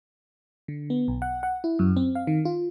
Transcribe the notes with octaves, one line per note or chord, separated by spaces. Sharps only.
D3
B3
B1
F#5
F#5
E4
F#2
C4
F5
D#3
F4